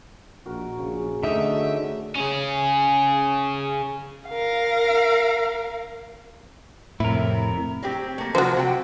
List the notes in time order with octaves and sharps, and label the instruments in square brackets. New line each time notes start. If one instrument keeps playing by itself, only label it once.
[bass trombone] A#1 [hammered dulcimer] F#4 A#4
[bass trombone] A#1 [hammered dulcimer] C#3
[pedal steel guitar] D3 D#4 [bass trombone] A3 [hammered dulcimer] F#4 [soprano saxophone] E5
[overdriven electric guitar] C#4 G#4
[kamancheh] A#4 F5
[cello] F2 C3 [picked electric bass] A2 [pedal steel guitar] E4 A#4
[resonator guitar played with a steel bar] F#3 C4 G4
A3 A#3
[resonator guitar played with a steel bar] C3 F3 F#3 [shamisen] F#4 C5
[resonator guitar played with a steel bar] C3 F#5 G5